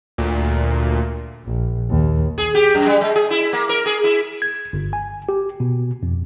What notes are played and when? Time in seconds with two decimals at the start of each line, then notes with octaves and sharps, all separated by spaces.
0.18 D2 A#2
1.45 A#1
1.90 D#2
2.38 G#4
2.55 G4
2.75 F#2
2.86 G3
3.01 G#3
3.16 G#4
3.31 E4
3.53 A#3
3.69 A#4
3.86 G#4
4.04 E4
4.42 G#6
4.73 G1
4.93 G#5
5.29 G4
5.60 B2
6.03 F2